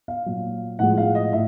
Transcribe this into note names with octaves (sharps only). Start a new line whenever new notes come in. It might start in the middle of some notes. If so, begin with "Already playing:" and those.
F5
A#2 F#3
A2 F3 G#3 F#5
F5
D#5
A2 E5